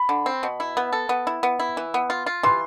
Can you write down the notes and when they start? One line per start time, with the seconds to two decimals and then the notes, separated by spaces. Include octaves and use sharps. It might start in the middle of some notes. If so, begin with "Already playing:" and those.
Already playing: B5
0.09 D3
0.26 C4
0.43 B2
0.60 E4
0.77 B3
0.93 A4
1.09 B3
1.27 E4
1.43 B3
1.59 E4
1.77 E3
1.94 B3
2.10 F4
2.26 F4
2.43 E3 C6